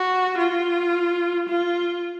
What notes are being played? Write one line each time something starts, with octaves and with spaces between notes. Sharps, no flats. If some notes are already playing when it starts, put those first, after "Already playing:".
Already playing: F#4
F4
F4